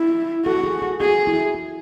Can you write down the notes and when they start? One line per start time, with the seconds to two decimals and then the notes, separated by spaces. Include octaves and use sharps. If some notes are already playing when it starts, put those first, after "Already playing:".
Already playing: E4
0.46 F#4 A4
0.64 G#4
0.82 G#4
1.00 F#4 G#4
1.27 E4
1.55 E4